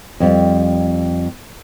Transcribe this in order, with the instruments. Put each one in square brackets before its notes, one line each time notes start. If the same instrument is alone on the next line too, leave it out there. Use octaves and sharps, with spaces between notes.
[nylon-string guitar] F2 G3